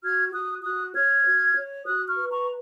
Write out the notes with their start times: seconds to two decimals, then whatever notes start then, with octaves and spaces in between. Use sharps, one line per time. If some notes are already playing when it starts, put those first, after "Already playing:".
0.03 F#4 F6 G#6
0.33 F#4 D#6 F#6
0.63 F#4 D#6 F#6
0.94 C#5 F6 G#6
1.25 F#4
1.56 C#5
1.85 F#4 D#6 F#6
2.09 C#6 F6
2.17 B4
2.31 A#5 C#6